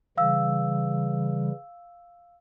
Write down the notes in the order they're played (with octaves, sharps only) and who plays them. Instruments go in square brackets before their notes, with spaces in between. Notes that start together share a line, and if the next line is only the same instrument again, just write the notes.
[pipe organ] C#3 E3 G3 [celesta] F5 E6